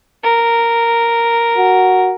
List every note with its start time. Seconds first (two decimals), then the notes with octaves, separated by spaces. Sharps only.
0.23 A#4
1.57 F#4